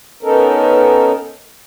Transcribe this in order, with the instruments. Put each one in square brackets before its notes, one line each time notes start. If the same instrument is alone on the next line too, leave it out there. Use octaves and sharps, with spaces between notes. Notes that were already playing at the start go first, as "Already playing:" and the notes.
[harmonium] B3 C#4 D#4 A4 A#4